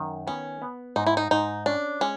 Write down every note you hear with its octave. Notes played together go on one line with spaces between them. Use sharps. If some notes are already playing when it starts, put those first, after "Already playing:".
Already playing: F#2 D#3
B3 C#4
B3
G#2 D#4
E4
D#4
G#2 D#4
C#4 D4
G#3 C#4